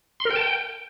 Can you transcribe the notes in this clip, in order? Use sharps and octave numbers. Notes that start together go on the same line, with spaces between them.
C6
A#4
G5
A5
G5